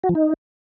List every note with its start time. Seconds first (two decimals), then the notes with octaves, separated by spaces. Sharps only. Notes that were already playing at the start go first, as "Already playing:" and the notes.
0.04 F#4
0.09 F3
0.15 D#4